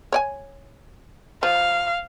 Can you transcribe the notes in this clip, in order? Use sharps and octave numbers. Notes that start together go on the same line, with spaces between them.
C#5 D5 G#5
F3 F5